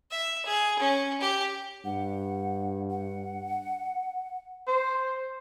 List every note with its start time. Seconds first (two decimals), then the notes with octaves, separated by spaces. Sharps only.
0.11 E5
0.46 G#4
0.79 C#4
1.21 G4
1.85 G2 F#5
2.90 F#5
4.67 C5